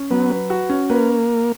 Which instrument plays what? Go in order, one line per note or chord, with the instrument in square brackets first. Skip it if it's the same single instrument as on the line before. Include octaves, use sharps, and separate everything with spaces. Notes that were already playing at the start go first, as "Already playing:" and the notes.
Already playing: [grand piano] C#4
[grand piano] F#3 [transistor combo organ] B3
[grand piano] B4
F#4
C#4
[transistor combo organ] A#3 [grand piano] B4